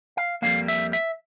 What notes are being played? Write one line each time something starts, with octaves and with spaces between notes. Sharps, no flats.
F5
F2 E3 G3 A#3 F5
E5
E5